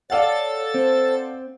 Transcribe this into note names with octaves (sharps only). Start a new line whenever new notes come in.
A4 C#5 D5 F5 F#5 A6
C4 C5